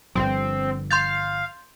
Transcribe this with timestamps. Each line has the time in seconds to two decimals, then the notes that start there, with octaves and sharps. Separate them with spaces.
0.15 G1 G2 F3 C4
0.91 F5 C6 G6 A6